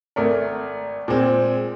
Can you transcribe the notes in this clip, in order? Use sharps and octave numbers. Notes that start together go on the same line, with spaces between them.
G#1 A3 A#4
A#2 G#3 C4